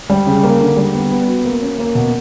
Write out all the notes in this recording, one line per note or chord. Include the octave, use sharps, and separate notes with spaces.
G3
C#3
A#3
D3
G3
B3
B3
F#4
A#3
C#4
A#3
B2